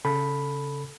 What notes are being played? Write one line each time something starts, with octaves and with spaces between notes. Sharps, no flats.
C#3 A4 B5